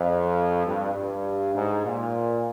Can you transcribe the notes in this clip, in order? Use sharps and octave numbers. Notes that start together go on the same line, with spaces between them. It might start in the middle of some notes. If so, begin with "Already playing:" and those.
Already playing: F2
G2
G2
G#2
A#2